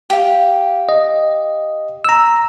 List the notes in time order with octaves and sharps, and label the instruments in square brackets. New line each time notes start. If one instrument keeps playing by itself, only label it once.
[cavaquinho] G4 F5
[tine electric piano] D#5
A#5 E6